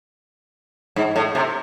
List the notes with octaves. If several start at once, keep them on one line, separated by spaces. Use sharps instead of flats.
G#2
A2
C3